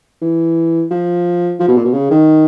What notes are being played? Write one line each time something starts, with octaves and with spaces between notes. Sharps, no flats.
E3
F3
F3
B2
A#2
B2
C#3
D#3